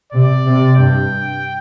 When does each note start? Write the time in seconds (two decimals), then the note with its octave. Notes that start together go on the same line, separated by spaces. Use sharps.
0.12 C3 D5
0.45 C3
0.76 G2 G5